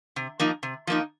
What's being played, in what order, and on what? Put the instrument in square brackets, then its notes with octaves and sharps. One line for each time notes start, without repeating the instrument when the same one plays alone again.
[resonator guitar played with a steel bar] C3
F3 A#3 D#4
C3
F3 A#3 D#4